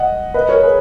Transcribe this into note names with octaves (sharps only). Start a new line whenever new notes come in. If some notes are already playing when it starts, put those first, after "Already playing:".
Already playing: D#5 F#5
B4 D#5
A#4 C#5
G#4 B4